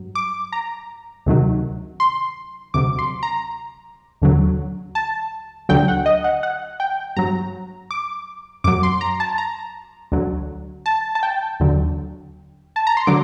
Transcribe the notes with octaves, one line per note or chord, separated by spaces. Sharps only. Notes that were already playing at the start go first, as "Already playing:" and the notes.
Already playing: G2 F#3
D6
A#5
D2 C3 D#3 F#3
C6
D2 C3 F#3 D6
C6
A#5
D#2 D3 F#3
A5
D2 D3 F#3 G5
F#5
D#5
F#5
F#5
G5
G2 F#3 A#5
D6
F#2 F#3 D6
C6
A#5
A5
A#5
D2 D3 F#3
A5
A5
G5
D#2 D3 F#3
A5
A#5
C6
D3 F#3 D6